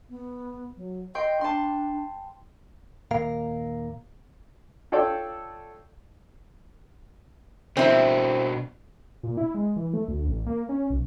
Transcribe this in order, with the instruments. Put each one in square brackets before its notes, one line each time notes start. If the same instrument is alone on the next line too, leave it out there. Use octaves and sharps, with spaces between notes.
[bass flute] B3
F#3
[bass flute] D#5 [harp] G5 C6
[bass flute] D4 [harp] A5 C6
[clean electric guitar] D#2 A#2 A#4 F5
[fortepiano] F4 A4 C#5 D5 G5
[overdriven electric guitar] B2 D4 [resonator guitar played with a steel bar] C4 E4
[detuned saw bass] A#2
E4
G#3
E3
A3
D2
A1
A#3
C#4
B1